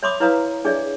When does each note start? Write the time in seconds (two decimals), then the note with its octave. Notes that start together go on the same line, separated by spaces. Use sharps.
0.03 C#5 E5 B5 C6 D6 D#6
0.20 E4 B4 C#5 F5 A#5 D#6
0.65 D4 G#4 C#5 D5 E5